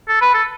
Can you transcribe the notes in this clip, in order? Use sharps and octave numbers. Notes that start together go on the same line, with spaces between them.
A4
B4
A4